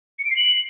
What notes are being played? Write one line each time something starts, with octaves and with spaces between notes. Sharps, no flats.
C#7
D7
C7
F#7